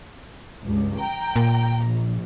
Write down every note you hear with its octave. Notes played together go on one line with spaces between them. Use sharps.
C#2 G2
G5 A#5
A#2
A#1